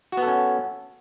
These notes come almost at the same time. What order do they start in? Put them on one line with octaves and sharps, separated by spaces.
F#4 B3 A4 C#4